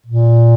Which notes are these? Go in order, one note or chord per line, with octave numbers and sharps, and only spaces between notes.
A#2